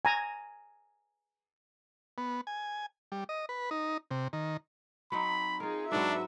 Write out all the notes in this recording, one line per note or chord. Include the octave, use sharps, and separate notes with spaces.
G#5 A#5
B3
G#5
G3
D#5
B4
D#4
C3
D#3
F#3 C4 D#4 B5
D#4 F4 G#4 A#4
G#2 F#3 D4 F#4 B4 E5